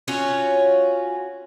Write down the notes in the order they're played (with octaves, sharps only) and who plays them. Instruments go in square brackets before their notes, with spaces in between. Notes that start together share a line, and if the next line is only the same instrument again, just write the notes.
[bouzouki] C#4 F4 F#4 C#5